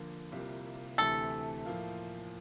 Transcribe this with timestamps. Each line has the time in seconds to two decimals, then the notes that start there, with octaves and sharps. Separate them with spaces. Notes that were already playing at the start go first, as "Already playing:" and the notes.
Already playing: D3 F3 A#3
0.32 C2 C3 G3 A#3 F4
0.98 D2 C3 E3 A3 A4
1.65 A2 F3 A#3 F4